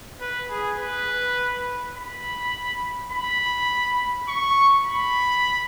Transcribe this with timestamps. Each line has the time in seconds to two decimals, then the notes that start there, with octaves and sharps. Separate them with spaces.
0.21 B4
0.50 G#4
0.79 B4
1.96 B5
3.12 B5
4.29 C#6
4.86 B5